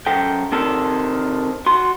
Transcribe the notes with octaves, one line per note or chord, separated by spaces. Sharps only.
F#2 A4 G5
C3 D#3 A4
F#4 C6